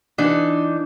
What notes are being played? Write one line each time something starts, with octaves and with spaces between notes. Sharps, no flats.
E3 D4 D#4